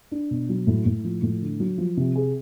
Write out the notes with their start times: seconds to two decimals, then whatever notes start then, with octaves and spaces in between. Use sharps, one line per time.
0.12 D4
0.31 B2
0.49 F#3
0.67 A2
0.86 A2
1.04 F3
1.22 A2
1.42 D3
1.60 F#3
1.78 F3
1.97 C3
2.16 G#4